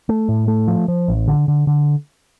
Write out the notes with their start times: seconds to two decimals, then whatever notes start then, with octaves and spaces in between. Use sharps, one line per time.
0.09 A3
0.29 A2
0.48 A3
0.68 F3
0.88 F3
1.08 A1
1.28 D3
1.48 D3
1.67 D3